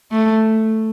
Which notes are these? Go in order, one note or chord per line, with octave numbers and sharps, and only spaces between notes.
A3